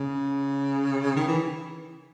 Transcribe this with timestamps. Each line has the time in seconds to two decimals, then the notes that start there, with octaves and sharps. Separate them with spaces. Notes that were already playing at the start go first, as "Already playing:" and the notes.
Already playing: C#3
1.16 D#3
1.28 E3